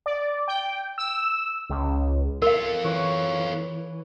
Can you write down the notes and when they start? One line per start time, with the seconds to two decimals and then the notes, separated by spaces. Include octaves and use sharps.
0.06 D5
0.48 G5
0.98 E6
1.70 C#2
2.42 F4 A4 A#4 F5
2.84 E3 C#5 B5